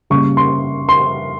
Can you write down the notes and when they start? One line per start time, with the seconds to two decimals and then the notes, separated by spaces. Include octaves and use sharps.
0.10 C#3 G3 A#3 C#6
0.37 C6
0.89 C6